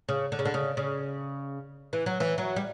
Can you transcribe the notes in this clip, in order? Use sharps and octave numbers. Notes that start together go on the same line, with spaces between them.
C#3
D3
C#3
D3
C#3
C#3
E3
F#3
E3
F#3
G3